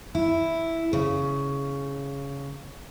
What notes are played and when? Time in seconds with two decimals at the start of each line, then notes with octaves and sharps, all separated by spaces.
0.15 E4
0.93 C#3